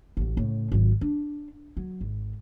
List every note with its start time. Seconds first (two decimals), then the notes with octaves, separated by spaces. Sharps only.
0.17 A1 D2
0.37 A2 C#3
0.72 G#1 F#3
1.01 D4
1.77 F#3
2.01 G#1